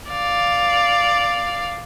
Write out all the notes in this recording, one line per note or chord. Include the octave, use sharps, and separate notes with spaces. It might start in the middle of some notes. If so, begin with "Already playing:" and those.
D5 F5